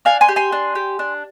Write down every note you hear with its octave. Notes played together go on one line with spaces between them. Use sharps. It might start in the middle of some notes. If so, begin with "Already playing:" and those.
D4 F5 G#5
G#5 C6
G4
G#5 C6
D4
G4
D4